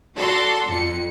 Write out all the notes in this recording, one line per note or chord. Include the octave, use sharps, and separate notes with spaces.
F#4 A4 D5 A#5 C6
F2 C#7